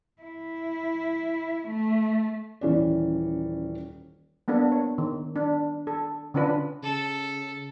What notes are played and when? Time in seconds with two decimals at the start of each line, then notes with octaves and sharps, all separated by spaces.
0.22 E4
1.68 A3
2.61 D#1 E3 C#4 D5
4.48 A#3 B3 D4 A4
4.72 C#5
4.98 D#3
5.36 D4
5.87 A4
6.34 D3 C#4 D4 F4 B4
6.83 C#3 A4